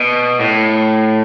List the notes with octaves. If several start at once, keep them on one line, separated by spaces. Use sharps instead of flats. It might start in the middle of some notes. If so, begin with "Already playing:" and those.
Already playing: B2
A2